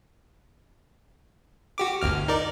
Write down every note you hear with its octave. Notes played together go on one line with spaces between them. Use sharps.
F#4 G4 D6
G1 D2 F6
D#4 A#4 D5